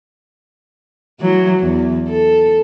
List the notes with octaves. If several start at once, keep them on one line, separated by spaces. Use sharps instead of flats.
E3 F#3
E2
A4